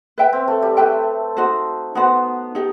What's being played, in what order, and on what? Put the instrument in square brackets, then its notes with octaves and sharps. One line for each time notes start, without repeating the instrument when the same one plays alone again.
[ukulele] B4 E5 G5
[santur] C4
A3
G3
[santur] A3 [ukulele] B4 E5 G5
[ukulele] D#4 F#4 C5
[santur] B3 [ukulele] D#4 F#4 C5
[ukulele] D#4 G4